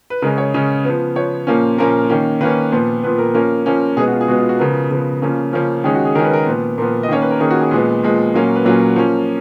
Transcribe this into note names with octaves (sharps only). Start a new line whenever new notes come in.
B4
C#3 G#3 C#4 A#4
C#5
C#3 G#3 C#4
F3 B3
F3 B3 C#5
A#2 F3 A#3 C#4
A#2 F3 A#3 C#4 A#4
D#3 A#3 C#4
D#3 A#3 C#4 B4
A#2 F3 B3
A#2 F3 B3 B4
A#4
F3 A#3 C#4 A#4
F3 A#3 C#4
B2 G#3 B3 G#4
F#4
F4
G#4
B2 G#3 B3 F#4
F4
F#4
C#3 F3 B3 A#4
C#3 F3 B3
C#3 F3 A#3 C#4
C#3 F3 A#3 C#4
D#3 G#3 C#4 G#4
F#4
G#4
D#3 G#3 C#4 A#4
B4
A#4
A#2 F3 B3
A#2 F3 B3 A#4
D#5
D#3 A#3 C#4 C#5
B4
A#4
D#3 A#3 C#4 G#4
F#4
G#4
A#2 F3 G#3 B3
A#2 F3 G#3 B3
A#2 F#3 A#3 C#4
B4
A#2 F#3 A#3 C#4 C#5
F3 A#3 C#4